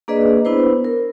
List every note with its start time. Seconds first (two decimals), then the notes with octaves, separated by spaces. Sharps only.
0.08 A#3 D4 G#4 B4 D5 D#5
0.45 B3 D4 E4 B4 C5
0.85 A#4